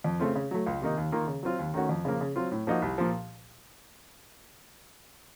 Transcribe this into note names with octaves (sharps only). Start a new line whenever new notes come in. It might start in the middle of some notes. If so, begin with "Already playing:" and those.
F2
C#3 A3 C4 F4
C#3
F#3 A3
C#2
C3 D#3 A#3 D#4
D#2
D#3 A#3 F4
C#3
F#3 C4 F4
D#2
D#3 A3 C#4 F#4
F2
C#3 F3 A#3
C#3
F#3 C4 F4
A2
F3 A#3 D#4 F#4
C2
A#2 F3